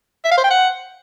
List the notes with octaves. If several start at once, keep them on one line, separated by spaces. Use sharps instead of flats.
E5
F5
C5
G5
F#5